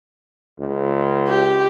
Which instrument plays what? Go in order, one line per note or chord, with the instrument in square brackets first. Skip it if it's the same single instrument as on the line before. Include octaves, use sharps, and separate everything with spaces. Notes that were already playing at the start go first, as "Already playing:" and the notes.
[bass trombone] C#2
[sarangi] G4